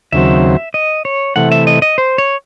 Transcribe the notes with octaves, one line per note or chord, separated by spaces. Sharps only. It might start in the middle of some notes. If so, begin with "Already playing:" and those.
D#2 C#3 F#3 C4 E5
D#5
C#5
C3 E3 A3 F#5
E5
D#5
D#5
C5
C#5